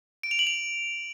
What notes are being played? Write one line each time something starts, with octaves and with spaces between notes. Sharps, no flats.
D7
F7
F#7
F7